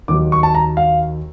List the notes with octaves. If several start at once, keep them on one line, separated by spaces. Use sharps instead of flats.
D#2 D#3 F#3 D6
C#6
A5
A#5
F5